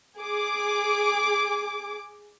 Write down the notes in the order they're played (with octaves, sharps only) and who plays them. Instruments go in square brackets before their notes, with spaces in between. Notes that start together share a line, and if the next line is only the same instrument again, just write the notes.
[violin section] G#4 D6